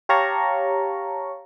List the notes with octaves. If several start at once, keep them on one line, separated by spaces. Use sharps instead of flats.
G4 C#5 F5 A5 A#5 C#6